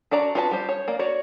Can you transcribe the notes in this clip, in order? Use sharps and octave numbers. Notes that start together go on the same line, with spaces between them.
D4 F#4 D5 A#5
F4 F#4 B4 C5 A5
G3 C5
C#5
A#3 D5
F#4 C#5 D5